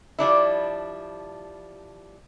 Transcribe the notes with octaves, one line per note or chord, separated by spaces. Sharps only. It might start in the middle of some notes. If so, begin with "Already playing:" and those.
F3 G3 D4 E4